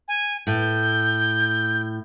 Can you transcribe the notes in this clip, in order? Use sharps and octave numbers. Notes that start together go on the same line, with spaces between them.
G#5
A2 G6